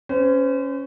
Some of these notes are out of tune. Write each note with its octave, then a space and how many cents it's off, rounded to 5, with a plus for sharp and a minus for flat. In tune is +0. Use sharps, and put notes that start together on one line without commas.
C#4 +0 C5 -40